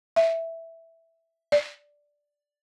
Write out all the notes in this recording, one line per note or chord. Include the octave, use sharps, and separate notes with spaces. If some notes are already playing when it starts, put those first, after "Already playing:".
E5
D5